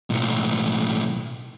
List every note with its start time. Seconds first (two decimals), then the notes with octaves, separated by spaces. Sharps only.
0.10 B1 A2